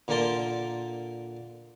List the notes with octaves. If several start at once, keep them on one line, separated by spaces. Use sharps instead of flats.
A#2 D3 A#3 A#4 A5 C6